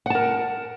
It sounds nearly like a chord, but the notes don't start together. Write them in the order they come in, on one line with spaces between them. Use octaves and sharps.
F#5 A5 A#4